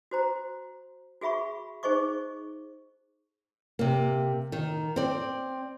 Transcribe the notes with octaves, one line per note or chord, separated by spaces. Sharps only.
F#4 C5 A#5
F#4 G#4 E5 B5 C#6
D#4 G#4 C5 D#5 C#6 D6
C3 A#3
D#3
C4 D5